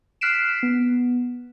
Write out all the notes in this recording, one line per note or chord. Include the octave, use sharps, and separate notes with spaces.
F6 F#6 B6 C7 D7 E7
B3